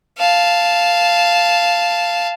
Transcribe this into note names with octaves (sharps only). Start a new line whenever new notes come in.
F5 A5